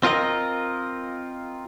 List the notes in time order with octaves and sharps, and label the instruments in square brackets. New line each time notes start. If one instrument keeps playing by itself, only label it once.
[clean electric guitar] C4 F4 A#4 D#5